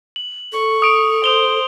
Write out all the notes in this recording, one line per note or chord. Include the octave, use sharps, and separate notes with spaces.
F#7
A4 C#6
D#6 D7 F7
C5 D#6 F7 G7